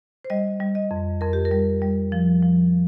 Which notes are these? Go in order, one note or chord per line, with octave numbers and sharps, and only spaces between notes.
C5
G3 D#5
G3
D#5
F2
F2 A#4
G4
A#4
G3
G3
F3
F3